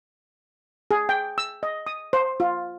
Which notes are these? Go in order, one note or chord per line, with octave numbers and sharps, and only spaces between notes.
G#4
G5
E6
D#5
D#6
C5
F4